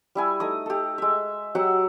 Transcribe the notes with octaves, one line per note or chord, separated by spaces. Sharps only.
G3 E4 G#5
A3 D#4 D#6
G4 A4
G#3 E5
F#3 G4 F#5 E6